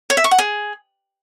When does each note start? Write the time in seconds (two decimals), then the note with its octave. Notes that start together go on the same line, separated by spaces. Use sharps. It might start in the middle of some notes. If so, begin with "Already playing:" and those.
0.10 C#5
0.17 E5
0.24 C#6
0.31 F#5
0.39 G#4